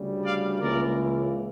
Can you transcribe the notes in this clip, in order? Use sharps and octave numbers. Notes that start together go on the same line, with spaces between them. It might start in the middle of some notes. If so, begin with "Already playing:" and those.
Already playing: D2 C#3 G3
D5 F5
C#2 C#3 E3 A#3 A#4 D5